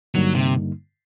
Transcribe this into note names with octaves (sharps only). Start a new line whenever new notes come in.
G2 D3 F#3 G3 A#3 D#4
C3